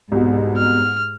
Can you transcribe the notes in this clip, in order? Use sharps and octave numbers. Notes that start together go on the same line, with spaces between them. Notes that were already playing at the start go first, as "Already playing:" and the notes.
C2 G#2 B2
F6